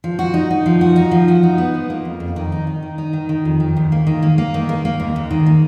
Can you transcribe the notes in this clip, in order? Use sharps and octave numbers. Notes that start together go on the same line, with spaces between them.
F3
F#4
D#4
D#4
F3
F#4
D#4
F3
F#4
D#4
B3
F3
A#3
F2
F2
D#3
D#4
D#4
D#3
D#4
D#3
D#3
F2
D#3
D#2
A#3
D#3
A#3
A#3
D#3
A#3
A#3
D#2
D#2
D#3
A#3